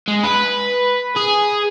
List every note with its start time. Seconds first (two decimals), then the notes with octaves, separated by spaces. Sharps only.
0.08 G#3
0.24 B4
1.17 G#4